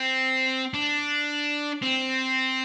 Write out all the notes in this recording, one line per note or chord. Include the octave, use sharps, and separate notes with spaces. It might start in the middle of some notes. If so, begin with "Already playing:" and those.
Already playing: C4
D4
C4